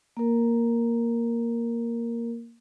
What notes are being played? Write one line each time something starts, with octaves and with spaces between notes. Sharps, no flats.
A#3 A#4